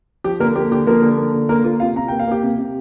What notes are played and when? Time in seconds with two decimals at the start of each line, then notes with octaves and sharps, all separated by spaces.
0.24 F3 G4
0.40 D3 A#3 A#4
0.55 A#3 G4
0.71 D3 G4
0.87 F3 A#3 A#4
1.02 D3
1.18 A#3
1.34 D3
1.49 A#3 A#4
1.64 A#3 F4
1.80 C3 F4 F5
1.96 C3 A#5
2.08 A#3 G5
2.19 F5
2.27 A#3 G4 G5
2.43 C3
2.58 C3